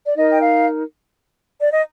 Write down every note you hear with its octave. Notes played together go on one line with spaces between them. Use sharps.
D5
D#4 A#4 D#5
G5
F5
D5
D#5